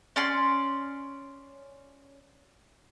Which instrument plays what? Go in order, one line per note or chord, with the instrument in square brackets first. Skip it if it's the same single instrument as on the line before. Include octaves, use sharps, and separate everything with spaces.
[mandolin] C#4 D5 C6